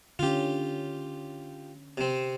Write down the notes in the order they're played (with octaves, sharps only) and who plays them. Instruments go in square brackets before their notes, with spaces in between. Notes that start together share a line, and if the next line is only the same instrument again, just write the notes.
[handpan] D3 C#4 [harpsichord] F4 G4
[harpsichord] C3 C4